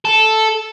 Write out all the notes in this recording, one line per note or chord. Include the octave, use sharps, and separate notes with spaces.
A4